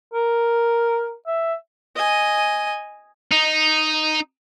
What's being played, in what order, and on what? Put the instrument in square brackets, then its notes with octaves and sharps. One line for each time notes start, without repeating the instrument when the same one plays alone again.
[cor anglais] A#4
E5
[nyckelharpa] D#5 G#5
[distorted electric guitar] D#4